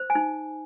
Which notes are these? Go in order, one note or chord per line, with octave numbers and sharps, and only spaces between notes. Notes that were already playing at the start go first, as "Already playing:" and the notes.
Already playing: C5
G#5
D#4